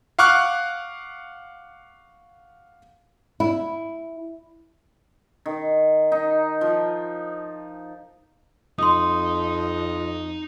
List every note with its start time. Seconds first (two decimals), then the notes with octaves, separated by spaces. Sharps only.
0.19 F5 F#5 C#6 D6 F6 F#6
3.40 E4
5.46 D#3
6.12 D#4
6.61 F3
8.79 F2 D#4 C6 D#6